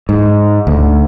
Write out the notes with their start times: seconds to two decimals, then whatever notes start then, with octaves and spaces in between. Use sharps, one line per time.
0.09 G#2
0.67 D2